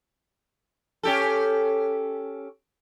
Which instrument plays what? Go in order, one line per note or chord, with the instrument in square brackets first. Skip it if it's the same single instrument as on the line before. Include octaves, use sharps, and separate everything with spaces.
[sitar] C#4 G4 A4